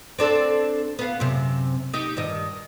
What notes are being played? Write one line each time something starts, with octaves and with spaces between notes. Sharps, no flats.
C4 D4 A4
B3 F5
F#2 C3
D#4 G4
G2 D#3 D#5